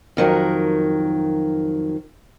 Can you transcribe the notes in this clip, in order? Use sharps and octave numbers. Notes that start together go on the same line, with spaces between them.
F2 D#3 F#3 A#4